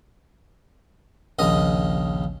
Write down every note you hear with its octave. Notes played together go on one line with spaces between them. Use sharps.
A#1 D#2 C#3 D#5